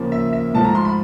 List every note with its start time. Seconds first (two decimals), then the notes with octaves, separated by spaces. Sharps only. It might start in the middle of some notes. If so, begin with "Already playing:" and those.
Already playing: D#2 C#3 F3 A#3
0.12 E5
0.33 E5
0.54 G#2 F3 A3 A5
0.65 A#5
0.75 C6
0.85 B5